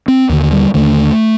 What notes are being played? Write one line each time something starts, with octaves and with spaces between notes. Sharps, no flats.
C4
D#2 D3
G3
D#2 D3 A3